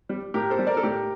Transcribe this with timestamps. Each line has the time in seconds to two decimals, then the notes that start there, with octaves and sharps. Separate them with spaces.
0.09 G3
0.34 A2 G4 A#4
0.50 A4 C5
0.59 G3
0.67 A#4 D5
0.77 A4
0.83 A2 G4 A#4